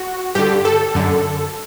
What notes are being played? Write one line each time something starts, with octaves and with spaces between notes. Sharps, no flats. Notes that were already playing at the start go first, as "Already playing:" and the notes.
Already playing: F#4
G2 D3 G4
A4
F#2 D3